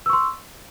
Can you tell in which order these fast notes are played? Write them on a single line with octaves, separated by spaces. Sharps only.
E6 C#6 C6